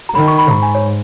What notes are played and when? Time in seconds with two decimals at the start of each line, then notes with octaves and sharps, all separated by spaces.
0.09 A#5
0.15 D#3 B5
0.28 C#6
0.38 B5
0.50 G#2 A#5
0.62 G#5
0.75 C#5